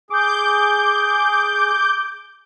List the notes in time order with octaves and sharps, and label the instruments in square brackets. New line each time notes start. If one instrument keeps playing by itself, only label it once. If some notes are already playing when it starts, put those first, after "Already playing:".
[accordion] G#4 [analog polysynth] D6 G6